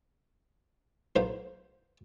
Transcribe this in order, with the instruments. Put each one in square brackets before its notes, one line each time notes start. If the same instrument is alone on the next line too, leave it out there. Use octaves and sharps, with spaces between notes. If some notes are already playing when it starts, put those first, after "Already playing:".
[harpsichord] B1 B3 C5 F5